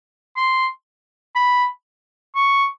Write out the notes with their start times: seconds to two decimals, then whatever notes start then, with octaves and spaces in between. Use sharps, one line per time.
0.36 C6
1.35 B5
2.35 C#6